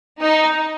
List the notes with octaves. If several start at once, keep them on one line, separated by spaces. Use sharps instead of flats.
D#4